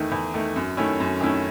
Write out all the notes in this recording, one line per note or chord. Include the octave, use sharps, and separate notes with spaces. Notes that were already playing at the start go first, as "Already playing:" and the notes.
Already playing: E2 D#3 A3
E2
D#3 A3
F#2
D#3 A3 C#4 E4
F#2
D#3 A3 C#4 E4